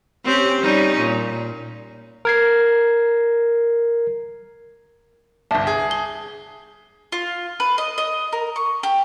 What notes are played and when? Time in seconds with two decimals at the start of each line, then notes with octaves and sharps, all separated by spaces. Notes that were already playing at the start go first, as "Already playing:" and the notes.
0.25 C4 C#4 G4
0.62 G3 C#4 D#4
1.00 A#2
2.25 A#4 G#6 C7
5.51 G1 C2 E5 A5
5.67 G#4
5.91 G7
7.12 F4
7.60 B4
7.78 D#5
7.98 D#5
8.33 A#4
8.56 C#6
8.83 G4